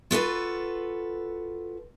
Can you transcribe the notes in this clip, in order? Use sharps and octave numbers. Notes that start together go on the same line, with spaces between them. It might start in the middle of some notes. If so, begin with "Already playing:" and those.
F4 F#4 A4 B4